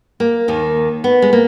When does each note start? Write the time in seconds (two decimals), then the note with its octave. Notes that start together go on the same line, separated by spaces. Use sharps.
0.20 A#3
0.48 D#2 D#3
1.04 B3
1.22 G#3
1.33 A#3